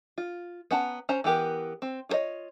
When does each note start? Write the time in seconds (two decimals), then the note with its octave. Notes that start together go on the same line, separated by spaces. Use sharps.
0.18 F4
0.71 B3 C#4 F#5 A5 A#5
1.09 C#4 C5 A#5
1.24 E3 B3 G4 A#4
1.82 C4
2.09 F4 F#4 A#4 C#5 D#5